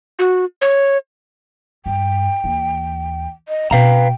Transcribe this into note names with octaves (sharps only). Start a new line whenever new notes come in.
F#4
C#5
G2 G5
D#2 E3
D#5
B2 B4 F5 G5 A#5